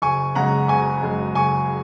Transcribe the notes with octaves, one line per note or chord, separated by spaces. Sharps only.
F#1 G#5 C#6
F#2 C#3 G#3 F#5 A#5
F#1 G#5 C#6
F#2 C#3 G#3
F#1 G#5 C#6